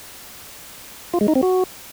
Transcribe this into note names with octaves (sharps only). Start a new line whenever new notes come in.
F4
G#3
D#4
C4
F#4